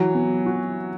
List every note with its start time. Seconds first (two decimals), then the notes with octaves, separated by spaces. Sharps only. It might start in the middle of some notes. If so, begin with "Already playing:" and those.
Already playing: E3 F#3
0.15 B3
0.46 F#4